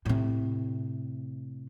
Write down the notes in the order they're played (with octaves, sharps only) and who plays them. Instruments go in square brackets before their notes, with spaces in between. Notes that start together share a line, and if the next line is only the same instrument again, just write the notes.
[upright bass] A2 C3